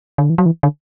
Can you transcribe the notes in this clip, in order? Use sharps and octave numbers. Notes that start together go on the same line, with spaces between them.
D3
E3
F#3
E3
D3